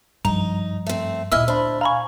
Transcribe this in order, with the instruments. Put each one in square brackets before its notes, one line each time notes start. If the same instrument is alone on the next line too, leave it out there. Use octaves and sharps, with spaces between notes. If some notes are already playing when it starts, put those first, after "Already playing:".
[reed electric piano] G2 [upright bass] F3 G3 [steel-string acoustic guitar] D#4 [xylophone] A#5
[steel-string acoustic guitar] A3 C4
[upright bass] D2 A#2 [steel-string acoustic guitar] E4 D#5 G#5 [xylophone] E6 F6
[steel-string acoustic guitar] D4 [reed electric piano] C5 B5
[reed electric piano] F5 G#5 [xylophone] A#5 B5 C#6